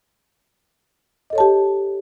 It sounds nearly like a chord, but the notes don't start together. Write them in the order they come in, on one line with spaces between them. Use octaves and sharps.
D#5 A4 C#5 A5 G4